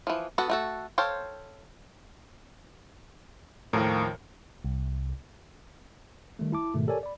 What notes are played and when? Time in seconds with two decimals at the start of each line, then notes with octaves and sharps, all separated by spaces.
0.07 E3 F3
0.38 B3 F#4 A4 F#5
0.50 A3 F#4 A4
0.98 A4 C5 C#5 F5 G5
3.73 D#2 A2 F3 A#4
4.64 C2
6.39 D#3 G3 A3
6.52 E4 A5 D6
6.74 G#2 B2 D#3 G#3 A3
6.87 G4 A4 A#4 C#5 D5 G#5
7.03 D5 B5